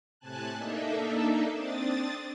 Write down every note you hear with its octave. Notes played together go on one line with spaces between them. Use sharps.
A2 C3 G#5 A5 F#6
A#3 D4 D#4 A4 E5
C4 D4 D#6 A6